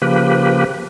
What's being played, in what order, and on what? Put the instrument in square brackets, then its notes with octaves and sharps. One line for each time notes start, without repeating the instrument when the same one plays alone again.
[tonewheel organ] C#3 F3 A#3 G4 B4